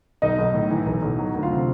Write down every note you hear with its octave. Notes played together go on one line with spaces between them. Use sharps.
B1 D#4 D#5
B1
A2
E3
B1
B1
F#3
D2
F4 F5
C3